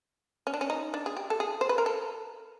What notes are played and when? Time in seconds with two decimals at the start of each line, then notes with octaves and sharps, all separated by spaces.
0.47 C#4
0.54 D4
0.61 C#4
0.70 D#4
0.94 D4
1.06 G#4
1.17 G4
1.30 A4
1.40 G#4
1.61 C5
1.69 B4
1.78 A#4
1.86 A4